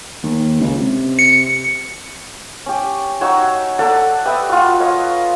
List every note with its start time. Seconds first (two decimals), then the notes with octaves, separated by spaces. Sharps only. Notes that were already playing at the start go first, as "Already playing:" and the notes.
0.23 D#2
0.60 C#2
0.79 C3
1.19 C#7
2.66 C#4 G4
3.21 D#4 F#4 C#5 E6
3.79 A4 D5 F#5
4.25 G4 B4 D#5 E5
4.49 F4 F#4
4.80 C#5 D#5 F5